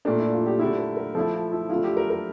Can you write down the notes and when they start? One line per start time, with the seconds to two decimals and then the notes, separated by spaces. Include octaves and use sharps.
0.05 A#2 A3 D4 A#4
0.19 E4
0.32 F4
0.46 G4
0.59 D3 A3 E4 G4
0.78 A#4
0.96 A#4
1.15 F3 A3 E4 A4
1.34 F4
1.52 E4
1.69 D3 F3 A3 E4 F4
1.84 G4
1.97 A#4
2.10 A#4